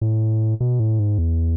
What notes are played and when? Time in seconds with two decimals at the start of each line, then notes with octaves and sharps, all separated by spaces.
0.01 A2
0.60 B2
0.80 A2
0.99 G#2
1.18 E2